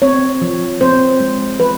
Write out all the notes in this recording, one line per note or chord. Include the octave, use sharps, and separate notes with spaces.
C4 C#5
F3
C4 C5
G#3
F3 B4